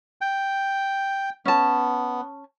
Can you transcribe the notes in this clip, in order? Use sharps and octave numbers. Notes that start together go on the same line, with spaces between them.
G5
B3 C#4 A5